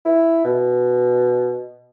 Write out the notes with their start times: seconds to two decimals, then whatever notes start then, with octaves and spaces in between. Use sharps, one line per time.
0.05 E4
0.45 B2